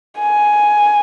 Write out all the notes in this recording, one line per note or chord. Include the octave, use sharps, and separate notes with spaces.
G#5